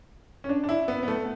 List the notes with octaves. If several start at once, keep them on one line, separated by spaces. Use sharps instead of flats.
C#4
D4
D4
E4
B3
B3
A3